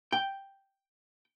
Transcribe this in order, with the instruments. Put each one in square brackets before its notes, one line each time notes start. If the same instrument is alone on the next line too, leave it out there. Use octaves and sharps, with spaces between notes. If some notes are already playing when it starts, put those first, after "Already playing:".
[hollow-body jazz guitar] G5